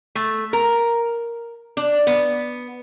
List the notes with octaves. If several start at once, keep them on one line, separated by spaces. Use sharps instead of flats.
A3
A#4
D4
B3